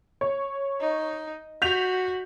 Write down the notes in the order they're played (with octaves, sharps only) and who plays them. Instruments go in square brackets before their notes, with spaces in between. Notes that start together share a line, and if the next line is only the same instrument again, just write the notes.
[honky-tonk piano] C#5
[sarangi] D#4
[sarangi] F#4 [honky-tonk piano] G6 B6 F7